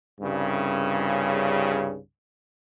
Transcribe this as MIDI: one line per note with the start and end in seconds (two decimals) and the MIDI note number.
0.21 1.98 36
0.21 1.98 43
0.21 1.98 49